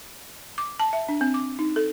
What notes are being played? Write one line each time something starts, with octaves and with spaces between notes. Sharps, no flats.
D6
A5
E5
D4
C4
D6
D#4
A4